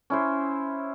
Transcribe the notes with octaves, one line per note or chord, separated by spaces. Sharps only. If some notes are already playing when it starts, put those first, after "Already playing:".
C#4 E4 C5